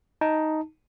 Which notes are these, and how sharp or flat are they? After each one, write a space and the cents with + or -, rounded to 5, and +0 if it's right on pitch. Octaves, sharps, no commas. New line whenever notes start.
D#4 +5 A5 +15